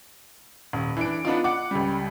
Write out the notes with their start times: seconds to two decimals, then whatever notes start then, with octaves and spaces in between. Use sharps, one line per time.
0.73 D#1
0.97 E3 D4 D7
1.25 B3 D4 D#4 F4
1.44 F#5 D6
1.71 C#2 G3